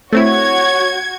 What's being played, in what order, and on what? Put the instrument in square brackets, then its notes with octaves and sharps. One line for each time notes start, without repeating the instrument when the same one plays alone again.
[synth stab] A3 C4 E4 [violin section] F#4 G#6 [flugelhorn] C#5